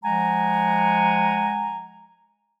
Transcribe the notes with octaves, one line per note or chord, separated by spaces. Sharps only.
F3 G#3 F#5 G#5 A#5